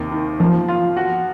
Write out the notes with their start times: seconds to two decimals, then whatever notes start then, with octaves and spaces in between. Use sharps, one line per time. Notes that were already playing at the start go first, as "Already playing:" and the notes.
Already playing: D#2 C3
0.12 D#3
0.40 F3 A#3
0.68 F4
0.97 F#4